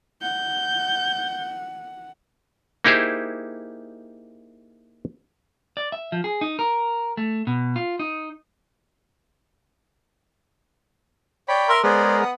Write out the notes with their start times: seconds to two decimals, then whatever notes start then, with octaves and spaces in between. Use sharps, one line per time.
0.22 F#5 G6
2.84 A#3 D#4 E4 G4 G#4 C5
5.77 D5
5.92 E5
6.12 F3
6.24 G#4
6.41 D#4
6.59 A#4
7.17 A3
7.47 B2
7.76 F4
7.99 D#4
11.48 C#5 D5 G5 B5
11.69 A#4 E5 C6
11.84 G#3 B3 G#4 A#4 C5 D5
12.21 F#5 D#6